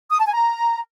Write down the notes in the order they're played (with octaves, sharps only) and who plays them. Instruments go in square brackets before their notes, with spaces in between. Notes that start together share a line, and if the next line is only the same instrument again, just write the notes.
[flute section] D#6
A5
G#5
A#5